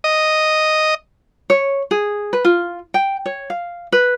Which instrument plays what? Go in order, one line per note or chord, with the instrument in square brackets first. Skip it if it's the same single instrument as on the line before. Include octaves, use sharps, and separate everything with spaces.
[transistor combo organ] D#5
[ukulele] C#5
G#4
B4
F4
G5
C#5
F5
B4